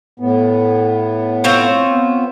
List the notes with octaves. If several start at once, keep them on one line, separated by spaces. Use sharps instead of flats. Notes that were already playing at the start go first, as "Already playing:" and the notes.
A2 B3
C4 F4 C#5
B3